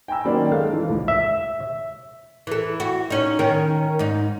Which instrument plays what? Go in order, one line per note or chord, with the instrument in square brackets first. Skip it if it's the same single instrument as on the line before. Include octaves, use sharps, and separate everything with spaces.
[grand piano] G5 G#5 A#5 B5 E6
D#3 F#3 A#3 C#4 C5 D5
G#3 A4 F5 F6
E3
C#2
[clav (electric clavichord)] E5
[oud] E3 A4
F#4
C#4 D#4
D#3 C#4 A#4
G#2 D#4